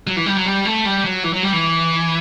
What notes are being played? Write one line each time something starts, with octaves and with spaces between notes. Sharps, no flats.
F#3
E3
G3
F#3
G3
A3
G3
F#3
E3
F#3
G3
E3